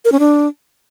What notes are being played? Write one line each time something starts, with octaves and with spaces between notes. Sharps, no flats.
A#4
C#4
D4